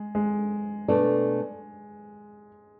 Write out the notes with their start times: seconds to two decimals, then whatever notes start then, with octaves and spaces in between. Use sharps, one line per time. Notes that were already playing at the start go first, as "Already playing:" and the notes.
Already playing: G#3
0.15 G#3
0.88 B2 A3 D4 A4 D5